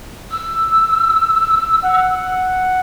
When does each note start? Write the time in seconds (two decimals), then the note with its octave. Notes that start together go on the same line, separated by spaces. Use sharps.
0.31 E6
1.84 F#5